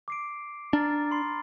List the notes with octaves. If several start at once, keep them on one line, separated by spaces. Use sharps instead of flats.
D6 C7 D7
D4 A#5 F6 A6
B5 C6 C7